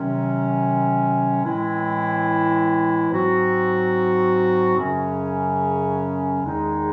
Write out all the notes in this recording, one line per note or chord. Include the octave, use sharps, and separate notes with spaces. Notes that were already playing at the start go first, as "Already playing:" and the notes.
Already playing: C3 D#3 F#3 C#4
A2 E3 G#3 C4 E4
G#2 F#3 C4 F#4
F#2 C#3 F#3 C#4 G#4
E2 D#3 G#3 D#4 G#4